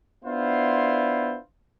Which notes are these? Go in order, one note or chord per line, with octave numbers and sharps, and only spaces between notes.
B3 D4 E4 F4 C5